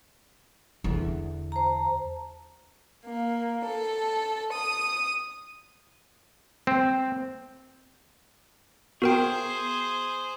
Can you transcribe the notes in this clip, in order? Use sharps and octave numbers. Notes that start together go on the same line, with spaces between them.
E2 D3
C5 A5 A#5
A#3
A4
D#6
C4
B3 F#4 G#4 A#4 C5 G5